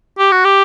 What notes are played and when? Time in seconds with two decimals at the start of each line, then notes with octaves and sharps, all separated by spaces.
0.19 G4
0.32 F#4
0.45 G4